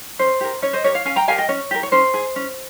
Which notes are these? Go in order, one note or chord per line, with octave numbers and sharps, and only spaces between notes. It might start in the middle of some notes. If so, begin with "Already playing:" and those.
C#4 C5
G4 A#4
C#4 C#5
C5 D#5
G4 A#4 C#5
C#5 F5
C#4 F5 G#5
G5 A#5
G4 A#4 F5 G#5
D#5 G5
C#4 C#5
G4 A#4
C#5
C#4 C5
G#4
C#4